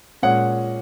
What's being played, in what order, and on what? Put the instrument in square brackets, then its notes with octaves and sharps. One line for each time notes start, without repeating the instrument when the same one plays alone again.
[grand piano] A#2 G#3 C#4 F#5